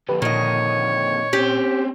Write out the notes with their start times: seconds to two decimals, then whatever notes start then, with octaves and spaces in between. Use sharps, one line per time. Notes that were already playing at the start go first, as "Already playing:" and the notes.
0.09 F2 D3 G4 B4
0.22 A#2 D#3 C#5 D#5
1.33 C4 C#4 G4